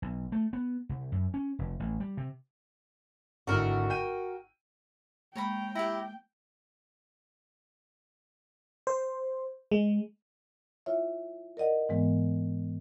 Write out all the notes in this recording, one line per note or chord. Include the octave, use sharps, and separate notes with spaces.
B1
A3
B3
C2
F#2
C#4
F1
A1
G3
C3
G#1 D3 E4 F#4 A#4
G5 G6 D#7
G#3 A#3 C#5 G5 A#5 B5
E4 G4 A#5
C5
G#3
E4 F4 C#5 E5
A#4 D5 D#5 F#5
G#2 E3 G#3 B3